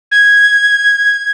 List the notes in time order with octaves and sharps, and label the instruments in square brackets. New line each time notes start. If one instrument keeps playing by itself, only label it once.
[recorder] G#6